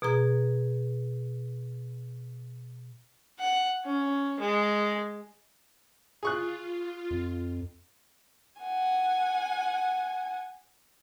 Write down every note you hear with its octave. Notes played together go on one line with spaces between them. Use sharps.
B2 G#4 A#5 G#6
F#5
C#4
G#3
F4 G#4 C#6 F#6
F2
F#5 G#5